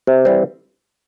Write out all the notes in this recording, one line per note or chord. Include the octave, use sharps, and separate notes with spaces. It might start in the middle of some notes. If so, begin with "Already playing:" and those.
C3
E3 G3 C4